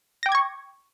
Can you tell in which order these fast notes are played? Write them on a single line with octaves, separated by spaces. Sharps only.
A#6 G5 D6 G#6 C#6